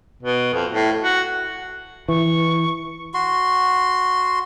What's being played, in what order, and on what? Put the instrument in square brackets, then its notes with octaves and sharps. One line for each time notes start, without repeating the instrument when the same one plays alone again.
[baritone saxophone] B2
F2
A2
F#4
[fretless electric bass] E3 [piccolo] C#6
[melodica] F#4 C6